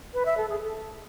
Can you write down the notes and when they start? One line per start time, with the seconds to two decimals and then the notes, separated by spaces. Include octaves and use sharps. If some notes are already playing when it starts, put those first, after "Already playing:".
0.14 B4
0.26 E5
0.37 A4
0.49 G#4
0.61 A4